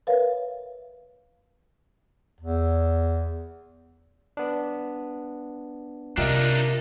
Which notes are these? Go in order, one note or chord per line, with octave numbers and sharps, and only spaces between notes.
A#4 B4 C#5 E5 F5
E2
B3 D4
C3 D4 D#4 F4 G4 A#4 D#5 E5